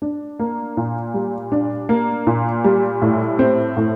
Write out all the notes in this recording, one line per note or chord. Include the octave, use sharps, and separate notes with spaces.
D4
A#3
A#2
G3
D4
A#3
A#2
G3
A2
C4
A2